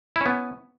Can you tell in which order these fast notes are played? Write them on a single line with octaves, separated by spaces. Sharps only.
E4 C#4 B3